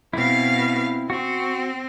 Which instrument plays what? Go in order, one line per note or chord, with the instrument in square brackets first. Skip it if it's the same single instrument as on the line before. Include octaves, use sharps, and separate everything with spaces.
[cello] B2 F5 [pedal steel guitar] C4 E4
[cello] C4 [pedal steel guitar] F#4 C#6